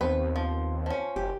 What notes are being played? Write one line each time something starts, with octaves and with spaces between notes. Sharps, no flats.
D#2 B3 C4 B4
F3
F3 C#4
F#1 G4